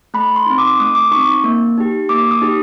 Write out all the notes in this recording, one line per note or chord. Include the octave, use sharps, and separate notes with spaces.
A3 B5
C6
C4 D#4
D6
A3 D#6
D6
C4 D#4 C#6
A#3
D#4 G4
A#3 D6
D#6
D#4 G4